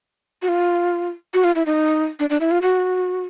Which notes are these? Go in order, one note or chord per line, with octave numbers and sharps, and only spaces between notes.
F#4
F4
F#4
F4
E4
D#4
D4
D4
E4
F4
F#4